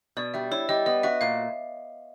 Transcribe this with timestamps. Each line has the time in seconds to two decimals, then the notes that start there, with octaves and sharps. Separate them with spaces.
0.17 B2 D5
0.34 G3 E5
0.51 E4 C#5
0.69 G3 D#5
0.86 B3 D#5
1.03 F#4 E5
1.21 A#2 F5